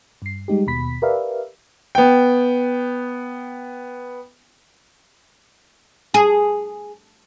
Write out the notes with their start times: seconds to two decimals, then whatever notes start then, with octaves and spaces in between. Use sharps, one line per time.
0.22 G2 C7
0.48 G3 G#3 D#4 G4
0.67 D#2 B2 B5 B6
1.02 G4 A#4 B4 D5 E5 F5
1.95 B3 G5
6.14 G#4